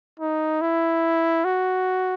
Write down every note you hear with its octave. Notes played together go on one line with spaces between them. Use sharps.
D#4
E4
F#4